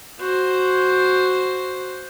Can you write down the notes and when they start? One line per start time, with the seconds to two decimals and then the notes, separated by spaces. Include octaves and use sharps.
0.20 F#4 C5